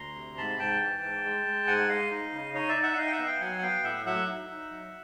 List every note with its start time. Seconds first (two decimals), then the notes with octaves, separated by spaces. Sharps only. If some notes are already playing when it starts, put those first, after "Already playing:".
Already playing: D2 A#5 C6
0.16 C3
0.37 G#2 A5 B5
0.59 G#2 G5 A5
0.81 E3
1.03 G#2
1.24 G#3
1.46 G#3
1.67 G#2 F#5 G#5
1.89 G#3 D#5 F5
2.11 D#4
2.33 C#3
2.54 D#4 C#5 D#5
2.69 D5 E5
2.76 D#4
2.83 E5 F#5
2.93 F#5
2.97 D#4 D#5 F5
3.07 G5
3.12 E5 F#5
3.19 B3
3.27 F5 G5
3.41 F#3 F#5 G#5
3.58 F#5
3.63 B3 F5 G5
3.84 A2 E5 F#5
4.06 F#3 E5 F#5
4.28 D#4
4.50 D#4
4.71 F#3